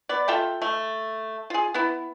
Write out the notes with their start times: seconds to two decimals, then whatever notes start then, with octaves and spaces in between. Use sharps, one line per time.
0.09 B3 D5
0.28 F4 A4 E5 G5
0.62 A3
1.50 F4 G#4
1.74 B3 E4